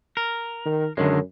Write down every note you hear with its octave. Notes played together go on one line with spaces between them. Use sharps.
A#4
D#3
F#2 D3 D#3 G#3